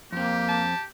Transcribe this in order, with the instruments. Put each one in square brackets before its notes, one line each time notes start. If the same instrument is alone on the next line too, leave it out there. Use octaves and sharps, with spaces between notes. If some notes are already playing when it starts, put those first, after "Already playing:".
[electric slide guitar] F2 C4 [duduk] A#3 [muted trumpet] G4
[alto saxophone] A5